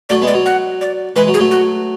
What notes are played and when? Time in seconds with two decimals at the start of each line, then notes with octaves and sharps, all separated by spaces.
0.09 F#3 A3 D5
0.22 G#3 B3
0.27 D5
0.34 F#3
0.46 F#5
0.81 D5
1.16 E3 G#3 B4
1.28 F#3
1.34 G#4
1.39 F#3 A3
1.51 F#4